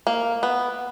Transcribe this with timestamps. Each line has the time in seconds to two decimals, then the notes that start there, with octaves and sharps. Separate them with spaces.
0.07 A#3
0.43 B3